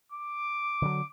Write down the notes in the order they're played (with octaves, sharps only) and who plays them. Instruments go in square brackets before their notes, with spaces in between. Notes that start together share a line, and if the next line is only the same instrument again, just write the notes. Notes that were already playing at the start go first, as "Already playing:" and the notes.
[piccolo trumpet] D6
[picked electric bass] D3 D#3 F#3